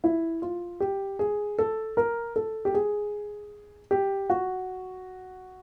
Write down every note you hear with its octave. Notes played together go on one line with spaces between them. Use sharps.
E4
F4
G4
G#4
A4
A#4
A4
G4
G#4
G4
F#4